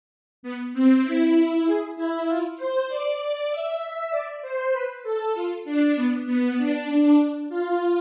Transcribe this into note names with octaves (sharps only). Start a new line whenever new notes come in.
B3
C4
E4
G#4
E4
F4
C5
D5
E5
D5
C5
B4
A4
F4
D4
B3
B3
D4
F4